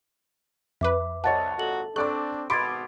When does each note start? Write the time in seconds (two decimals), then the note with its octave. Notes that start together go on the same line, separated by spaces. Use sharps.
0.81 F2 B4 E5 D6
1.24 C2 C#5 D#5 F#5 A5 A6
1.59 G#1 A#2 F#4 A4 F#7
1.96 C4 D4 A4 D5 C#6 D6 F#6
2.50 G#1 B2 B5 C6 D6 G#6 A6 D7